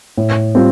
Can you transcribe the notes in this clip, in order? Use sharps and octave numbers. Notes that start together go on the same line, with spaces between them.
A2
G3 C4 F4